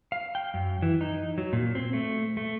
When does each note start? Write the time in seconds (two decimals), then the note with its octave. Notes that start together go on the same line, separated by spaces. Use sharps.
0.12 F5
0.35 G5
0.54 F#2
0.82 E3
1.01 D#4
1.38 F#3
1.53 A#2
1.75 C4
1.93 A3
2.37 A3